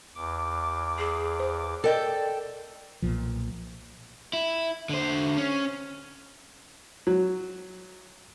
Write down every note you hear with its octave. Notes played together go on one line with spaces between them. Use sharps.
E2 D6
G#4
C5
A4 A#4 D5 D#5 G5
B1 A#2 F3
E4
D3 C5
C#4
F#3